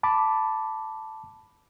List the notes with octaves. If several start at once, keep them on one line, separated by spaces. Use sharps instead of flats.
A5 B5 D6